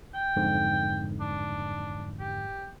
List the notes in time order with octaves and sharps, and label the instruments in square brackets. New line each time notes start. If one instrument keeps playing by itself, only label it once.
[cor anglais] G5
[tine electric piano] F2 G#2 D3
[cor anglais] D4
G4